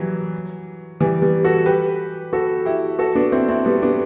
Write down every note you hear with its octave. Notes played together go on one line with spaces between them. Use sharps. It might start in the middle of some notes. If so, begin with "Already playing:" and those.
Already playing: E3 F#3 G3
E3 G3
G3 B3
F#4 A4
G4 B4
F#4 A4
E4 G4
F#4 A4
B3 D4
C4 E4
C4 E4
G3 B3
B3 D4